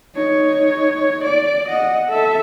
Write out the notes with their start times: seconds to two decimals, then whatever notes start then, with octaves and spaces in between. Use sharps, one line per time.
0.15 D#4 C#5
1.24 D5
1.68 D#5 F#5
2.09 A4 E5